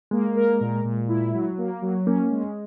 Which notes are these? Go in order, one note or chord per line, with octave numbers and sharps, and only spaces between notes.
G#3 A#3
A#4
A#2
A#2
E4
F#3
A#3
F#3
A#3 C#4
G#3